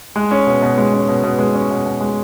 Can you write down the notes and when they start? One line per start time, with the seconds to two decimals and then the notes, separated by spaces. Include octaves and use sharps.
0.16 G#3
0.31 C#4
0.47 B2
0.62 B2
0.78 G#3
0.94 C#4
1.08 B2
1.23 B2
1.39 G#3
1.55 C#4
1.71 B2
1.85 B2
2.01 G#3